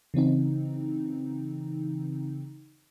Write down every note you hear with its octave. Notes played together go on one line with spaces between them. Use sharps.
C#3 E3 C4 D#4